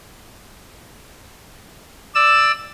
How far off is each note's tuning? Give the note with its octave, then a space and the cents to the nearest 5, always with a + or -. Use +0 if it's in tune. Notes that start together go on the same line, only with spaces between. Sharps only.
D5 +10 E6 +0